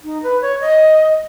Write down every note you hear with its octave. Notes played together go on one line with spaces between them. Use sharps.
D#4
B4
C#5
D#5